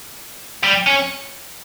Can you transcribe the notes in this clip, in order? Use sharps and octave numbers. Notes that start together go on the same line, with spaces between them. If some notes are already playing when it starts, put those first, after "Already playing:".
G3
C#4